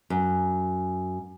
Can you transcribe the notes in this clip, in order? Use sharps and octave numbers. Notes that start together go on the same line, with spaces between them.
F#2